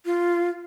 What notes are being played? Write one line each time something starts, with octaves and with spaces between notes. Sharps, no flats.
F4